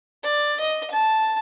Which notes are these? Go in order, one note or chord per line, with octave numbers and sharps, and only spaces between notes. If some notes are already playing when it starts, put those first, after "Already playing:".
D5
D#5
A5